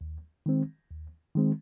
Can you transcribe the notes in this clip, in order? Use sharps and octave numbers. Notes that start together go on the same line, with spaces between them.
D#2
D#3 G#3 C4
D#2
D#3 G#3 C4